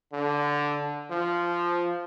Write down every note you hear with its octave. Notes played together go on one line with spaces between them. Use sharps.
D3
F3